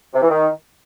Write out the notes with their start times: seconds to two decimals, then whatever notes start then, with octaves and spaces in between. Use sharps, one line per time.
0.14 C3
0.22 E3
0.30 D#3